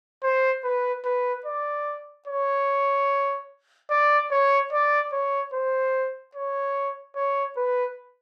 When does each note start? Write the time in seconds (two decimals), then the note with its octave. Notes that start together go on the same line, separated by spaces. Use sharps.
0.23 C5
0.64 B4
1.05 B4
1.46 D5
2.27 C#5
3.90 D5
4.31 C#5
4.72 D5
5.13 C#5
5.53 C5
6.35 C#5
7.16 C#5
7.57 B4